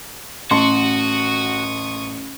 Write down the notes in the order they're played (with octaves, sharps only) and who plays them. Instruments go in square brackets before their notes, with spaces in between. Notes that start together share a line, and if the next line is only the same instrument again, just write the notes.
[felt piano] A1 [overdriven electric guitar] F#4 [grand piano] A5 C6 C#7 [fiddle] C#6 D#6